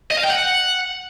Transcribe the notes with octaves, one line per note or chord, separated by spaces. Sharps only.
D#5
F5
G5
F#5